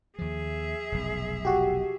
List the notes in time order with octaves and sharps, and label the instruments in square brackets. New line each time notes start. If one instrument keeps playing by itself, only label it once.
[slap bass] D#2 F3 [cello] G#4 E5
[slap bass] F1 B1
[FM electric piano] F#4 G4